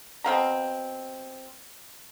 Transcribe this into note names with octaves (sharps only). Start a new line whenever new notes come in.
B2 C4 F5 A#5